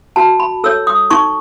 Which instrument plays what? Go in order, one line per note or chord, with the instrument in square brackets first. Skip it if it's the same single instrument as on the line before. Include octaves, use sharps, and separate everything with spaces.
[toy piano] F#4 A5
B5
A4 C#5 E6
D#6
D#4 C#6